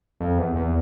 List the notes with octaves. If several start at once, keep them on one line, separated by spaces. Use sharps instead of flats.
F2
E2
E2